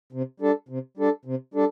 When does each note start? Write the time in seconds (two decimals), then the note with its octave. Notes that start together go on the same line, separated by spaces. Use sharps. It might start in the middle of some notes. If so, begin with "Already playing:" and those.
0.12 C3
0.40 G3 D4 A4
0.69 C3
0.97 G3 D4 A4
1.25 C3
1.54 G3 D4 A4